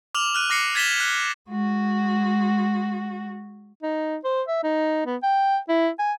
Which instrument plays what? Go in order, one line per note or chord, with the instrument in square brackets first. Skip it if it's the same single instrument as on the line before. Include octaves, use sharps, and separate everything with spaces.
[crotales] D6 F6 F7 F#7
F6 F#6 D#7
D6 A#6 C7 C#7
G#6 A6 B6 E7 F#7 G7
F#6
[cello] G#3 F#4
[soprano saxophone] D#4
C5
E5
D#4
B3
G5
E4
G#5